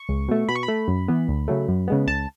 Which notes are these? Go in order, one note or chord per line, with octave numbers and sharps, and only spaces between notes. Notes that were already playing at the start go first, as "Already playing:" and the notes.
Already playing: C#6
C#2
B2 A3
B2 B5
C#6
B5
A3
F#2
E3 B3
D2
C#3 F#3 A3
F#2
C#3 G#3 B3
C#2 A5